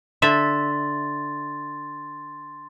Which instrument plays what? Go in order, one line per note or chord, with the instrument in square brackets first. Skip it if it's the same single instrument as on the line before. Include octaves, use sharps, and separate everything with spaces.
[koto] D3 E5 [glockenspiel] C6 A6